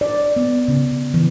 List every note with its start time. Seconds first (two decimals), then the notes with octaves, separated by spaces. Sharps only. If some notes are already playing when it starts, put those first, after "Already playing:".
0.01 D5
0.36 B3
0.68 C#3
1.14 E3